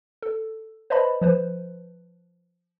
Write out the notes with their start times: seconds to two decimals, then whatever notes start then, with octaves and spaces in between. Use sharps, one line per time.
0.22 A4
0.90 B4 C5 D5 D#5 A5 B5
1.21 F3 B4 C5